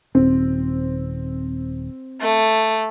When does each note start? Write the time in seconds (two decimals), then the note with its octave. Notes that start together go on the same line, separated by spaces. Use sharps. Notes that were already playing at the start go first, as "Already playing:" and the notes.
0.15 D#1 C4
2.21 A3